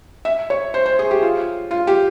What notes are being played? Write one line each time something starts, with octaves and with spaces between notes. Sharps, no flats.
E5
C#5
C5
C5
G#4
G4
F4
F4
G4